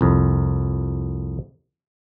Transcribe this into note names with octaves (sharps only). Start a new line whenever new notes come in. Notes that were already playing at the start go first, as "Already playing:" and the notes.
C2 F2